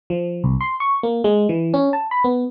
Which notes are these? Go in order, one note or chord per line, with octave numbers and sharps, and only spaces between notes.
F3
C2
C6
C#6
A#3
G#3
E3
C#4
A5
B5
B3